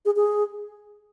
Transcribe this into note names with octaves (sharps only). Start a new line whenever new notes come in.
G#4
G#4